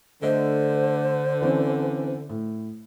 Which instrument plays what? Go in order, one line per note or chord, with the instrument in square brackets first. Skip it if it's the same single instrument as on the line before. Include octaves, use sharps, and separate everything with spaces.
[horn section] D3 [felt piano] A3 D#5 [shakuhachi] C5
[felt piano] E3 C4 C#4
A2